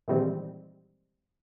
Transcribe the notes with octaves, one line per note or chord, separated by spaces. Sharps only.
A#2 D#3 E3 G3 G#3 C4